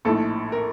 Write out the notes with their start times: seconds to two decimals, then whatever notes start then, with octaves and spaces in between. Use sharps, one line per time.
0.05 A#1 A2 A3 D#4 A4
0.52 A#4